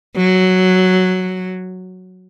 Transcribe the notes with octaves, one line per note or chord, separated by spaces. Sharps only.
F#3